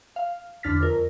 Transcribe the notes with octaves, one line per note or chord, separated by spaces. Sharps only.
F5
E2 D3 D4 F6 A6 B6
F2 A#4